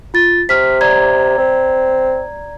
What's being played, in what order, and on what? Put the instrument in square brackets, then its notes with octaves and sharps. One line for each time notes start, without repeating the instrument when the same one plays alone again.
[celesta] F4 A6
[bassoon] C3 [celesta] F6 B6
[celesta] D5 A#5 G#6
[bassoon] C4